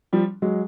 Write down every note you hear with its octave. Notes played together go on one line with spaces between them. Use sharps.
F3 G3
F#3 G#3